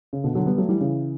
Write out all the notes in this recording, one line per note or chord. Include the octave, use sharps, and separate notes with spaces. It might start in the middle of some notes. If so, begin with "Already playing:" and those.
C#3
B2 D3
D3 F#3
G3 B3
F#3 A3
E3 G3
C#3 E3